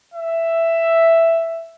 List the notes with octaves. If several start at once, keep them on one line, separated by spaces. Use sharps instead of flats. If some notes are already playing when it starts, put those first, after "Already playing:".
E5